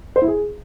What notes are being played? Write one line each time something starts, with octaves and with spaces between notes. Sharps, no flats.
C5
E4
G#4